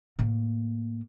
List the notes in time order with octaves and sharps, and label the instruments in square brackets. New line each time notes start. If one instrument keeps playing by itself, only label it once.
[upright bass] A2 A#3